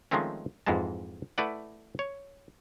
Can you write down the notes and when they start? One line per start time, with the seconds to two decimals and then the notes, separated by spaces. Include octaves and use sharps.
0.11 D#3 F3 G#3 A3 C4 C#4
0.66 F2 G#2 E3 G#3 A5
1.38 A3 E4 B4 D5 F#5
1.99 C#5